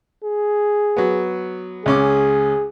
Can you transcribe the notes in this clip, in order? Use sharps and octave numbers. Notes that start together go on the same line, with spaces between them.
G#4
F#3 B3
C#2 C#4 G#4 D6